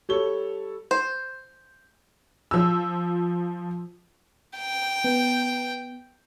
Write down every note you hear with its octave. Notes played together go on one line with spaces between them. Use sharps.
G3 A4 C#5 G7
C5
F3 E6
G5
B3